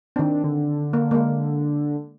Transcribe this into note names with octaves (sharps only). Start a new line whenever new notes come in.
D#3 C4 D4
D3
A#3
G#3 A#3